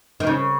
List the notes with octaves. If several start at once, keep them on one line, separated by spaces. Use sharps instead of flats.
D#3
C#3